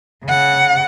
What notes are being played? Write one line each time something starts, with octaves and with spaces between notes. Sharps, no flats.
C#3 F#5